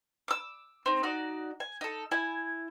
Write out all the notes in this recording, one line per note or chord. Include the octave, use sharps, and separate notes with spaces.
D6 E6
C4 D#4
D#4 F#4 D5
G#5
D#4 A4
E4 G#5